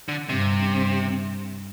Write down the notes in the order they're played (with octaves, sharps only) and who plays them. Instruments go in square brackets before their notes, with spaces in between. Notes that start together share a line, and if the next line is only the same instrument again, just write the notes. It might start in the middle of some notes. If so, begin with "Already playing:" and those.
[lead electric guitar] D3
[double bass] G2 [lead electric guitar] C3